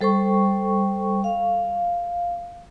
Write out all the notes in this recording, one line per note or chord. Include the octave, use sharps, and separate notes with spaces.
G3 A4 C5 G5 C#6
F5